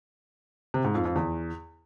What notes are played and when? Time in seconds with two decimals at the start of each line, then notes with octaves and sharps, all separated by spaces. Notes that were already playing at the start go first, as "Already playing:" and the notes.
0.74 C3
0.84 G#2
0.95 F2
1.05 F2
1.16 E2